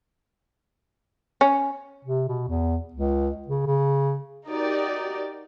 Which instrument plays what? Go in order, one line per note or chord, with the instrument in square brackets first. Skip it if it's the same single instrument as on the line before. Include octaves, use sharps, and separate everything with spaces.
[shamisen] C#4
[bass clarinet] C3
B2
E2
C#2
C#3
C#3
[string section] D#4 F#4 G4 A#4 D5